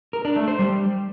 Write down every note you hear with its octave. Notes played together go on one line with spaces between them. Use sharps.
A#4
D4
A3
C5
G3